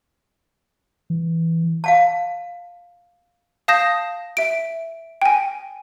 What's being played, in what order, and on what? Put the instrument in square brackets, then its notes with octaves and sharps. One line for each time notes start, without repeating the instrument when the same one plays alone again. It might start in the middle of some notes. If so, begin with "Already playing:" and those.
[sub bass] E3
[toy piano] F5 F#5 A5
[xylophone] F5 A5 D#6 G6 A#6 E7
E5 D7
G5 G#5